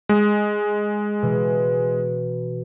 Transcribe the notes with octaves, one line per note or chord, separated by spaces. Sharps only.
G#3
B2 E3